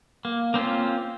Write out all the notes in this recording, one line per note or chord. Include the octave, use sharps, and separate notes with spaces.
A#3
A#3 C4 C#4 F4